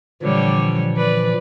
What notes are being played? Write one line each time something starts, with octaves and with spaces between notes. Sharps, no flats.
A#2 D3 E3 F3 G3 C#5
B4 D5